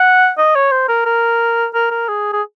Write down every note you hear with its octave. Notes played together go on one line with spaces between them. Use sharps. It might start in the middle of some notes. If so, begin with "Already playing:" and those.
Already playing: F#5
D#5
C#5
C5
A#4
A#4
A#4
A#4
G#4
G#4